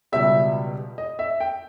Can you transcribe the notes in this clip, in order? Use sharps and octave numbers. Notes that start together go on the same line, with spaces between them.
C#2 B2 G3 E5
D#5
E5
G5